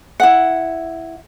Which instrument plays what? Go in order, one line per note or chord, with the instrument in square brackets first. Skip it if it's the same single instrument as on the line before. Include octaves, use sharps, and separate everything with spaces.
[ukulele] E4 F#5